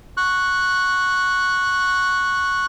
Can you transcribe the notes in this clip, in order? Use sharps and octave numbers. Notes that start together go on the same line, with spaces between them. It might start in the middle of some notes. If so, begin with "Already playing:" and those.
C#6 F#6